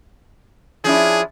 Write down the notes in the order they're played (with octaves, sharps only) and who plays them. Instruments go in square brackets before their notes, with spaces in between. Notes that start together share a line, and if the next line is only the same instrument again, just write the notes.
[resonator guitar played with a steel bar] F3 C#4 E4 [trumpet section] D4 G#4